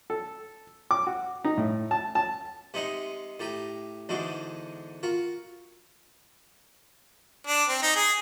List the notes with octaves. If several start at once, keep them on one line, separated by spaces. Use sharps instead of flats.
A4
D6
F#4
D#4
A2
A5
A5
C3 G#3 D#4 D#5 F#5
A2 G4 A#5 D#6
E2 G#2 D3 F#4 D#5 D6
F4 F#4 A#4
D4
C4
D#4
G#4